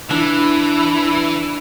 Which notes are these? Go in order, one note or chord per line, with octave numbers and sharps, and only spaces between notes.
E3 D4 E4